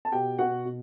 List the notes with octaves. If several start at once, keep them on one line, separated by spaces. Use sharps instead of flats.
A5
B2 G4 G5
B2 F#4 F#5
B2